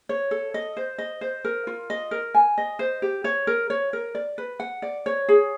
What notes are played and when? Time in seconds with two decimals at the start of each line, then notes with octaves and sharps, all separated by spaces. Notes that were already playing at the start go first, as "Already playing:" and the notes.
0.09 C#5
0.31 A4
0.54 D#5
0.77 C5
0.98 D#5
1.21 C5
1.45 A#4
1.67 F4
1.90 D#5
2.11 A#4
2.35 G#5
2.58 D#5
2.79 C5
3.02 G4
3.24 C#5
3.47 A#4
3.70 C#5
3.93 A#4
4.15 D5
4.38 B4
4.60 F#5
4.82 D5
5.06 C#5
5.28 G#4